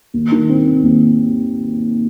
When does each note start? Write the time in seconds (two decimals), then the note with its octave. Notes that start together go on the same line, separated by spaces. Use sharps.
0.14 D#2
0.32 D#3
0.49 C4
0.66 C4
0.83 D#2